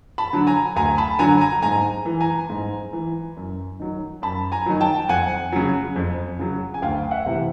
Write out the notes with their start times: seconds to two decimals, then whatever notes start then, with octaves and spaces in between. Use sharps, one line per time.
0.18 A5 B5
0.33 D3 F#3
0.47 G#5 A#5
0.76 D2 G#5 A#5
0.98 A5 B5
1.19 D3 F#3 G#5 A#5
1.41 G#5 A#5
1.62 G#2 G#5 A#5
2.06 E3
2.21 G#5 A#5
2.50 G#2
2.93 E3
3.37 F#2
3.79 D#3 F#3
4.22 F#2 A5 B5
4.52 G#5 A#5
4.66 D#3 F#3
4.81 G5 A5
5.09 F2 F#5 G#5
5.52 C#3 F#3
5.96 F2
6.39 C#3 F#3
6.74 G#5
6.82 D2 F5 G5
7.11 E5 F#5
7.26 C3 E3